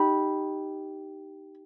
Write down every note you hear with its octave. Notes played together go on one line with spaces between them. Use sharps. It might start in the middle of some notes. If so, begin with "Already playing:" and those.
Already playing: D#4 G4 B5